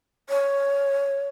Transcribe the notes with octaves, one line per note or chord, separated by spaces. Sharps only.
C#5